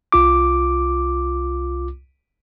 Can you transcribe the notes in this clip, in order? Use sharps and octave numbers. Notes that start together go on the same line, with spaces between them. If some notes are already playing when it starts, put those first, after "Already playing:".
C2 F4 D6